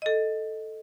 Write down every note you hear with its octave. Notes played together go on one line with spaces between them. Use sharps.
A4 D#5